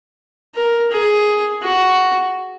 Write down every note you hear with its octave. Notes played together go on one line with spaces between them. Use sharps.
A#4
G#4
F#4